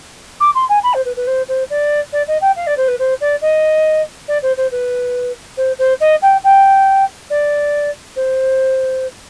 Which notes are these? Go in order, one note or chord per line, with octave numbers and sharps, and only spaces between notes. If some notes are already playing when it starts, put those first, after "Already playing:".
D6
C6
G#5
B5
C5
B4
B4
C5
C5
D5
D5
D#5
G5
F5
D5
C5
B4
C5
D5
D#5
D5
C5
C5
B4
C5
C5
D#5
G5
G5
D5
C5